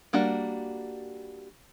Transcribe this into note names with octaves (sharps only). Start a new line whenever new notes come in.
G3 A#3 D4 F#4